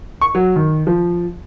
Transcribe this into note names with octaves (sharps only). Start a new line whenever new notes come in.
C#6
F#3
D#3
F3